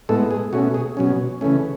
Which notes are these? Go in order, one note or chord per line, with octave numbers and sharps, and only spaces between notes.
A2 G#3 B3 A4
G#4
B2 A3 C#4 F#4
G#4
B2 F#3 C#4
C#3 E3 A3 C#4